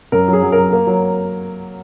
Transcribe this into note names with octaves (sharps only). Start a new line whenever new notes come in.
F#2 A#4
F#3
G#4
F#3
F#3 A#4
A#3
F#3